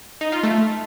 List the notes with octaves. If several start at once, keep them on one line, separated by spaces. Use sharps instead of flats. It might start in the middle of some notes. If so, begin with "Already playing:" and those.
D#4
F4
A3